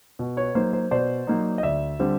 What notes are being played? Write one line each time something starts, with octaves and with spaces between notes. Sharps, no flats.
B2
B4 C#5
F#3 A#3 D#4 C5
C5
B2 C5 D5
F#3 A#3 D#4
D#5
D2 D5 E5
D3 G3 C4